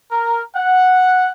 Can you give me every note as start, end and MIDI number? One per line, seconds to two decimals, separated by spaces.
0.11 0.41 70
0.55 1.30 78